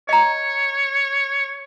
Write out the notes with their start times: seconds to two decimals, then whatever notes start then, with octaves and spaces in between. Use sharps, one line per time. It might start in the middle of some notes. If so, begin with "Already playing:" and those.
0.09 C#5 D#5 A#5